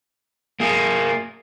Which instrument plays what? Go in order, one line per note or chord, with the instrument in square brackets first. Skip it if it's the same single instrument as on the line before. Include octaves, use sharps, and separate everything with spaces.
[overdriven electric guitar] A#3 G#4